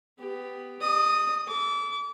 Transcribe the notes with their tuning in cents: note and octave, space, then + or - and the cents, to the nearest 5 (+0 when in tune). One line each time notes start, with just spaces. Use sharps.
B3 +15 G4 +5
D#5 -40 D#6 +0
A4 +0 D6 -35